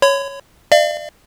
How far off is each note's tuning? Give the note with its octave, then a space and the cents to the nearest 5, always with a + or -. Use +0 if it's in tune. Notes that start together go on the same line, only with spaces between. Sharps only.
C#5 +0 B5 +40
D5 +40 F5 -40